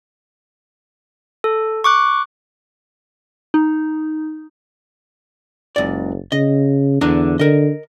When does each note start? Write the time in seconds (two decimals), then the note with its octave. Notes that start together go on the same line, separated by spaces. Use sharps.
1.44 A4
1.84 C#6 D6 F#6
3.54 D#4
5.76 F#1 C#2 D5
6.32 C#3 D#5
7.01 E2 D3 D4 A#5
7.39 D3 A#4 D#5